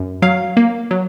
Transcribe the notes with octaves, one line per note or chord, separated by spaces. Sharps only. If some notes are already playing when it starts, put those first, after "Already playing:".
Already playing: F#2
F#3 F5
A#3
F#3